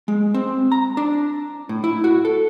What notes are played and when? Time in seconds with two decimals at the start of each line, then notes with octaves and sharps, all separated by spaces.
0.08 G#3
0.34 C4
0.72 A#5
0.97 D4
1.69 A2
1.84 E4
2.04 F#4
2.25 A4